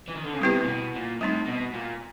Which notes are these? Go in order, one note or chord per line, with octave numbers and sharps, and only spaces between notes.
E3
D#3
D3
C#3
C3 G3 B3 E4 G4 B4
A#2
B2
A#2
A2 G3 C4 D#4
B2
A#2